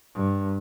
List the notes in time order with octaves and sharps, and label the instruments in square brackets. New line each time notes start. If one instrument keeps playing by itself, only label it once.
[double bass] G2